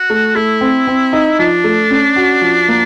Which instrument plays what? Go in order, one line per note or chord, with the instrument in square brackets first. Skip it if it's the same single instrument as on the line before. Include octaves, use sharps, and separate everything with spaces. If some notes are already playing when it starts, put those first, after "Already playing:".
Already playing: [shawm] F#4
[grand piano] A3
[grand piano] A3 [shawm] E4
[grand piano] C4
C4
D#4
[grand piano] F3 [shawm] D4
[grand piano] A3
C#4
F#4
F3
A#3